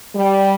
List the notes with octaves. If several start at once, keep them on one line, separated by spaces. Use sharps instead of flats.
G3